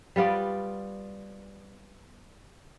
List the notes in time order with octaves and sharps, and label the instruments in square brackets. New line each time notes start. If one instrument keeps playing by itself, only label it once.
[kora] G3 B3 F4 D5